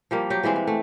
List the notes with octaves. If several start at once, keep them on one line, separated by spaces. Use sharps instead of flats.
F3 G3 A#3
F#3 G4
E3 G3 G#3 C4
G#3
A3